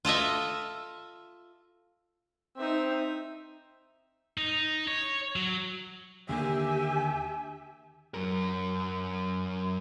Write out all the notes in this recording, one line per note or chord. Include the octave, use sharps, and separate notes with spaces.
F4 A4 D#5 E5
C4 D#4 E5
D#4
C#5
F#3
D#2 D3 A#3 G4 E5 G#5
F#2 A#4